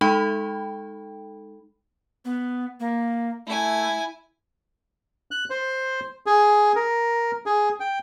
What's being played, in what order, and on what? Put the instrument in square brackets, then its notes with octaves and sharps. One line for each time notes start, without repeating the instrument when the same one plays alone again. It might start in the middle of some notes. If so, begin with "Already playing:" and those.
[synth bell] G#3 D#4 A4 G5 B5
[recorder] B3
A#3
[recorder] A3 [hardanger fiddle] E4 G#5
[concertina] F#6
C5
G#4
A#4
G#4
G5